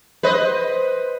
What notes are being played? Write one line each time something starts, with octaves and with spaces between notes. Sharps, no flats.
B4 C5 D#5